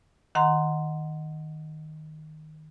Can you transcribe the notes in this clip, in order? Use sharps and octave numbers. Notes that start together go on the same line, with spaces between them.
D#3 F#5 A#5 C6